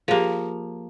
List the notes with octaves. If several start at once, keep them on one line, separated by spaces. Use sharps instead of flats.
F3 A#3 G4 G#4